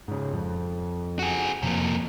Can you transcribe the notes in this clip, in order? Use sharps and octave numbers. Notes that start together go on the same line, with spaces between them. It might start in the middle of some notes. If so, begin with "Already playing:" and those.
G#2 C#3
F2
F#4 G#4
F2 C3 F3 A#3